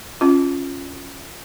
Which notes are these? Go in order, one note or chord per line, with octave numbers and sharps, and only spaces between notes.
C#4 F4